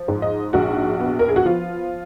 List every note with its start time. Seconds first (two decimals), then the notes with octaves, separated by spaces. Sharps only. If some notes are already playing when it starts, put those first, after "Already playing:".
Already playing: F3
0.08 G#2
0.22 D#5
0.53 A#1 F#4
1.00 B3
1.19 A#4
1.28 G#4
1.36 F#4
1.45 F3 F4